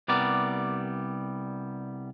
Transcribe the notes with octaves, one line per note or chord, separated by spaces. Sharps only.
C2 G3 B3 A#4 D5